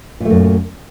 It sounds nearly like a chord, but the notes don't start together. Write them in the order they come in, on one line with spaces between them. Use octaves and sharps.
A#2 A3 F#2